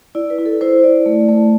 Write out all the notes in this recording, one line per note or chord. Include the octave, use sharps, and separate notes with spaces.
E4 D5
B4
E4
A4
E4 C5
E4 D5
A3
A3